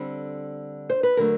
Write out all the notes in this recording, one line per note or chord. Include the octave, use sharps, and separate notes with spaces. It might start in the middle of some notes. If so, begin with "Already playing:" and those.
Already playing: D3 G3 C4
C5
B4
D3 F#3 A3 A#4